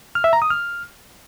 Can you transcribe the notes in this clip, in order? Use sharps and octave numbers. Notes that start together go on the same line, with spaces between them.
F6
E5
A#5
D#6
F6